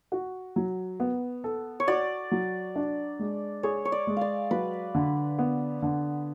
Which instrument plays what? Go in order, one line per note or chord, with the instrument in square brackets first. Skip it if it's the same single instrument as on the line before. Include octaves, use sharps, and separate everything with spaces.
[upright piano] F#4
F#3
B3
A4
[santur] C#5
[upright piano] F#4 [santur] D5
[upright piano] F#3
D4
G#3
[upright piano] G#4 [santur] C#5
[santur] C#5
D5
[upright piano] G#3
[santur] D5 F5
[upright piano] F#3 [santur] B4
[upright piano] D3
B3
D3